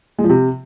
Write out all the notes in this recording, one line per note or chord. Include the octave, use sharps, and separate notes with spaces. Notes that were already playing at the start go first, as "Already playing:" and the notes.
G#3
F3
C3